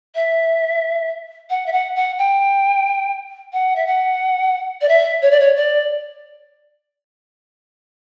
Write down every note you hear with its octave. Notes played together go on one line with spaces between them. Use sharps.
E5
F#5
E5
F#5
F#5
G5
F#5
E5
F#5
D5
E5
C#5
D5
C#5
D5